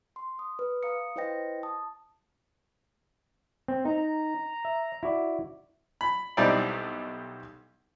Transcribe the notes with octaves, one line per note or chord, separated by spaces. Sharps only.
C6
D#6
B4
F5 A#5 D#6 C#7
E4 B4 C5 D#5 G5 A#6
A5 D#6
C4
D#4 A#5
E5
E4 F#4 D5
B5
B1 G3 C4 D#4 E4 D5